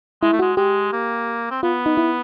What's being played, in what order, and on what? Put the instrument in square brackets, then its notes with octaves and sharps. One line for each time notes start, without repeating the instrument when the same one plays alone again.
[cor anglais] G#3 [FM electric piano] E4
[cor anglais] A3
[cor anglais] G#3 [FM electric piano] F#4
[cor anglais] G#3 [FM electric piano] G4
[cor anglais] A#3
C4
[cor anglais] B3 [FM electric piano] F4
[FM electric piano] D#4
E4